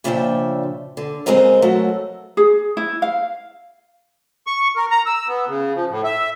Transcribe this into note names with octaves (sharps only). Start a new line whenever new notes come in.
A#2 C#3 F3 D4 E5 G5
D3
C#3 G#3 C4 A#4 D#5 F5
F#3 A3 F#4 A4 A#4
G#4
E4
F5
C#6
A#4
A#5
E6
B3
C#3
F3
A2
E5